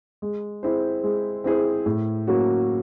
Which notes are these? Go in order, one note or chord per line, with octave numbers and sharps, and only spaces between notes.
G#3
C4 E4 G#4 C5
G#3
C4 E4 G#4 C5
A2
F#3 A#3 C#4 F#4